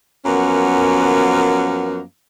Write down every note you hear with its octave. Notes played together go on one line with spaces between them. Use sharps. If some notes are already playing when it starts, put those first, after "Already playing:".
F#2 F3 A#3 B3 C#4